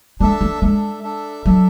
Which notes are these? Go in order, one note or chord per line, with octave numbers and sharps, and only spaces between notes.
G#3 D4 A4 E5
A3
G#3 D4 A4 E5
D4 A4 E5
F#3 D4 A4 E5